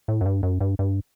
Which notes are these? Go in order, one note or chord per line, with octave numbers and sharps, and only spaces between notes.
A2
F#2
G2
F#2
G2
G2